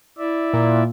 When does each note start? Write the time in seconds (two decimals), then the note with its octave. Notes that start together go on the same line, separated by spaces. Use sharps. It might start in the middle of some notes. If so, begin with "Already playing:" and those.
0.18 E4 D5 E5
0.53 A#2